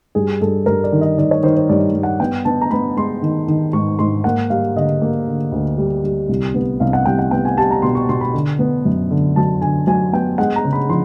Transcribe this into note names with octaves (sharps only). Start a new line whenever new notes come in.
G2 G#4
G2 A4
G2 A#4
D5
D#3
D#5
D#3 D5
C#5
D#3 C5
C5
G2 D5
G2
F#5
B3 G5
B3 A5
A#5
B3 B5
G#3 C6
D#3
D#3
G#2 C#6
G#2 C6
A#3 F#5
G3 F5
D3 D#5
A#3
D3
D2
G3
G3
C2
B3
C2 F5
F#5
C2 G5
F#5
B3 G5
G#5
G3 A5
A#5
B2 C6
C#6
B2 C6
B5
D3
B3
F#2
D3
F#3 A5
D3 G#5
F#3 G#5
B3 G5
G#3 F#5
A#5
C#3
B5
F3 C6